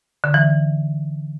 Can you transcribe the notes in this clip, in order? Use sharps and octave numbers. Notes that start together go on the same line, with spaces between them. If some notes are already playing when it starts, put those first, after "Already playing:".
D3
E3